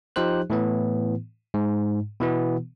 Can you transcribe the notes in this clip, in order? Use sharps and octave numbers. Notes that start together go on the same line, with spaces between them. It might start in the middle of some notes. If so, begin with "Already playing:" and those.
F3 D#4 G4 C5 F#6
A2 E3 B3
G#2
B2 E3 B3